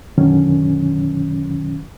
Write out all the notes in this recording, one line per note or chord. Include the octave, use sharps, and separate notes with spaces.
F#2 B2 D3 D#3 F#3 C#4